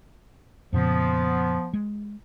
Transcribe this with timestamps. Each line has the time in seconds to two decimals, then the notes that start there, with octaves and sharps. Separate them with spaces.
0.73 F2 A#2 C#3 F3 B3
1.73 G#3